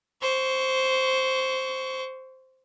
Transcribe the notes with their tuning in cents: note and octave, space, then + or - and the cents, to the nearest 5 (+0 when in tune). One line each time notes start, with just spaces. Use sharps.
C5 +0 C#6 +20